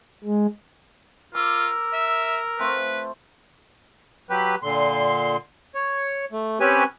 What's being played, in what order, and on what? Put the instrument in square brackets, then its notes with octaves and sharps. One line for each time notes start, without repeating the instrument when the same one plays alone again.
[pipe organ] G#3
[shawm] F4 [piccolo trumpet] A#4 [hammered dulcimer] D6 [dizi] E6
[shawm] E5
[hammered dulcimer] A3 C4 F4 [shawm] B4
[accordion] F#3 G4 B4
A#2 D3 C6
C#5
A3
C4 C#4 G4 B4 G#5